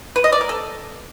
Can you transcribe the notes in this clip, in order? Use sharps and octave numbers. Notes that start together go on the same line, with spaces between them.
B4
D#5
D5
A#4
A4